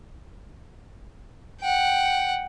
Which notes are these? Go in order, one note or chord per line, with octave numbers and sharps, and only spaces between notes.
F#5 G5